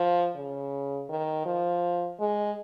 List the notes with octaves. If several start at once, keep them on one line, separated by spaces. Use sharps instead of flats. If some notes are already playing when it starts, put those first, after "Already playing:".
Already playing: F3
C#3
D#3
F3
G#3